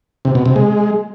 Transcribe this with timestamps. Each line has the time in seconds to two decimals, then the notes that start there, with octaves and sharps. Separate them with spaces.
0.25 C3
0.35 B2
0.46 C3
0.56 G#3